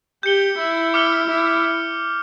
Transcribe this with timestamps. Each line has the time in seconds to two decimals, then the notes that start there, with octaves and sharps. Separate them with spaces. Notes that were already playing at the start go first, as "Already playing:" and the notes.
0.23 G4 G6 C#7 G7
0.58 E4
0.94 D6 F6 C#7 G7
1.28 E4